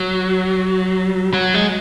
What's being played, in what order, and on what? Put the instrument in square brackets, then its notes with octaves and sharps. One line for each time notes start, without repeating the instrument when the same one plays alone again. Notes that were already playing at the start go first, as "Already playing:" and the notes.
Already playing: [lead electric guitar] F#3
F#3
G#3